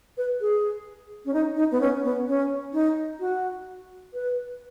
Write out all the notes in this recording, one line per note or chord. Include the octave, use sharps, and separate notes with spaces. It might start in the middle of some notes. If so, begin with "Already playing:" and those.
B4
G#4
C#4
D#4
D#4
B3
C#4
B3
C#4
D#4
F#4
B4